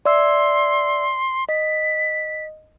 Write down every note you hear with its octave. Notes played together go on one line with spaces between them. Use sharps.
D5 E5 C6 E6
D#5 B6